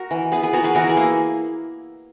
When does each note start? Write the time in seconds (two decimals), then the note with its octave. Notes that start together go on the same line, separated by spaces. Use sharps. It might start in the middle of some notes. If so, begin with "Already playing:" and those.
Already playing: F#4 A#4
0.11 E3
0.32 B3 G#4 B4
0.43 G#4 B4
0.53 B3 F#4 A#4
0.64 G#4 B4
0.75 E3 F#4 A#4
0.89 E4 G#4
0.97 A#3